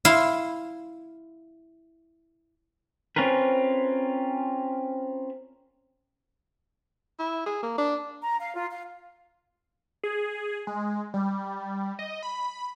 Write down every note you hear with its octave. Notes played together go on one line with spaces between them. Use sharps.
E4 F5 C6
C4 C#4 F4 A#4 B4
E4
G#4
A#3
D4
A#5
F5
F4
F5
G#4
G#3
G3
D#5
B5